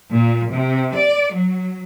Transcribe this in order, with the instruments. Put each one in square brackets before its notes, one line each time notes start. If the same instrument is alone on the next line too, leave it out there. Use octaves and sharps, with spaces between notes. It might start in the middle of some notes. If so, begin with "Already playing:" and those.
[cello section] A#2
C3
D5
F#3